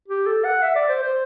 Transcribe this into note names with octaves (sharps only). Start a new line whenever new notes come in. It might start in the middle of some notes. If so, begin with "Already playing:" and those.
G4
A4
F#5
E5
D5
C5
C5